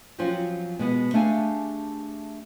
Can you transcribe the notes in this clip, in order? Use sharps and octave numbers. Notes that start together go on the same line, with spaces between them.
F3 F#3 C4 C#4 F4 F#4
B2 G#3 B3
A3 D4 G4 G#4 F5 G#5